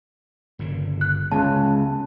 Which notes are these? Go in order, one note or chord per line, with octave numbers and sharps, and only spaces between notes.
G1 A#2 C#3
F#6
C#2 C#3 G#3 B3 A5